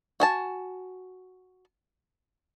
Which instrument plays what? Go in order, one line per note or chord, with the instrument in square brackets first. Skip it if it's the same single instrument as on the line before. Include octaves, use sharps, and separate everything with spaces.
[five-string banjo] F#4 G#5 A5